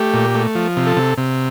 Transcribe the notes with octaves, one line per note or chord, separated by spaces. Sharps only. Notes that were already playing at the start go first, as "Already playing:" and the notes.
Already playing: A3 G4
A#2
A3
F3
C3
A4
C3
C3